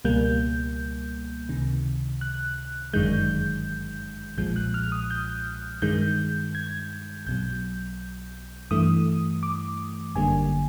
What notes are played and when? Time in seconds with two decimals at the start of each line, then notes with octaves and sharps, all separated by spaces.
0.05 C#2 B2 G3 A#3 G6
1.49 C#2 C3 D#3
2.21 F#6
2.93 G1 F#2 D#3 G#3 G6
4.38 B1 A#2 F3 G#3 G6
4.56 F#6
4.74 F6
4.92 D#6
5.10 G6
5.82 G2 D#3 G#3 G6
6.55 G#6
7.26 B1 B2 F#3 G6
8.71 G2 E3 A3 D#6
9.43 D6
10.15 G#1 F#2 D3 G3 A#3 G#5